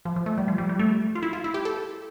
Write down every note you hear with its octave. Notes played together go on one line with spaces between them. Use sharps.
F3
F3
A3
G3
F3
G3
G3
A3
F4
E4
F4
E4
G4
A4